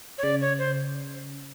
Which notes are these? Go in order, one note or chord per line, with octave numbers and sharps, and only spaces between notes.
C#5
C#3 D5
C#5
C5